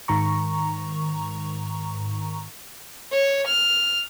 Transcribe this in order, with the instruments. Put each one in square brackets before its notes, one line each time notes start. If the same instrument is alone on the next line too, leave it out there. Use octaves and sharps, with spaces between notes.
[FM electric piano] G#2 D#3 A#5 C#6
[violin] C#5
F6